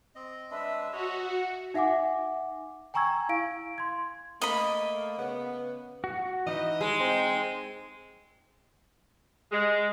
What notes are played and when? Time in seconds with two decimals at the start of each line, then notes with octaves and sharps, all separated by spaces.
0.15 C4 D#5
0.51 G#3 D4 B4 E5
0.93 F#4 C#5 D#5
1.26 E5 F#5
1.74 D#4 E5 F#5 G#5 D6
2.94 G5 G#5 A#5 C#6 E6 G#6
3.29 E4 F5 D7
3.78 C6 G#6
4.42 A3 A#3 D#5 B5
5.18 C#3 B3
6.04 F#4
6.47 E3 D#4 B4 D#5
6.81 G#3
7.00 C4 D#4
9.51 G#3